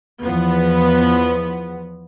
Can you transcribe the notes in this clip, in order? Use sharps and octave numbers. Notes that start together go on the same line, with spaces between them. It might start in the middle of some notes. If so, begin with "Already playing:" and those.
E2 F3 B3